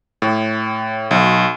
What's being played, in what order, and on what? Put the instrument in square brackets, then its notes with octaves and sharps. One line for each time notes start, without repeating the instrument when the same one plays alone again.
[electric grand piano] A2
B1